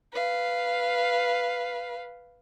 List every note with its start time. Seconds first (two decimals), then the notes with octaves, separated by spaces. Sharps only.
0.13 B4 F5